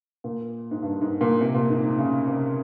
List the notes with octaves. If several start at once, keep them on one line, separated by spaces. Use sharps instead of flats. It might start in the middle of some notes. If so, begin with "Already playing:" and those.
A#2
G#2
G2
G#2
A#2
C3
A#2
G#2
G#2
C#3
C3